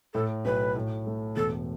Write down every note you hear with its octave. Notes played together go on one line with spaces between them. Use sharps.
A2 A4
B1 B4
A2
A3
E1 A4